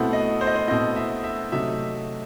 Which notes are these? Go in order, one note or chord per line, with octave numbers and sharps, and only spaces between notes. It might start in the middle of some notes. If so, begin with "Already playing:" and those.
Already playing: B2 A3 C4 E4 F#5
D#5
C5
D#5
C5
B2 A3 C4 E4 D#5
E5
E5
C3 F#3 A3 D#4 E5